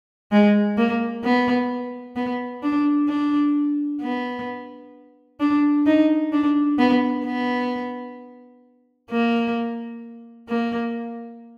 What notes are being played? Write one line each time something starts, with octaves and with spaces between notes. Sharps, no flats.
G#3
A#3
B3
B3
D4
D4
B3
D4
D#4
D4
B3
B3
A#3
A#3